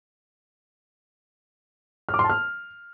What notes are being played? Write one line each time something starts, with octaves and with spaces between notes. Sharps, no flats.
F6
D6
C6
A5
F6